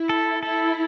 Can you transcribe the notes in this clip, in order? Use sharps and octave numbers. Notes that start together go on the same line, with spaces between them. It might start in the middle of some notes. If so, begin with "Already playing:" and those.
Already playing: E4
A4
E4 A4